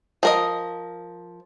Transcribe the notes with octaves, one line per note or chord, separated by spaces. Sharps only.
F3 A#4 D#5